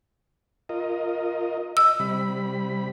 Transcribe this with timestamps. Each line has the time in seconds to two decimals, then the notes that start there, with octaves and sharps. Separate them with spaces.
0.69 F4 A#4 D#5
1.77 D#5 E6
2.00 C3 G3 B5